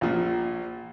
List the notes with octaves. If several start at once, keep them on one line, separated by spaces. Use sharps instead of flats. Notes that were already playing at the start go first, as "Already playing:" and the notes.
A#1 A#2